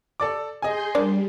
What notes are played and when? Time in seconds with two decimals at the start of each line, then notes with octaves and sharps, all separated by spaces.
0.20 A4 D5 D6
0.62 G#4 D#5 G#5 C6 G6
0.95 G3 A#3 D4 D5